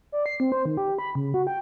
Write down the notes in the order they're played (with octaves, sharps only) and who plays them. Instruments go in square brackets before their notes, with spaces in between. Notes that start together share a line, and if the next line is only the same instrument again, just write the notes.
[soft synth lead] D5
C7
C4
C5
D#3
G4
B5
C#3
F#4
G5